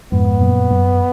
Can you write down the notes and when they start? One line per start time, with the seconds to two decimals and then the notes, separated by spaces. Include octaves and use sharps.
0.12 F2 G#2 B3
0.41 F#2 A#2
0.71 F#2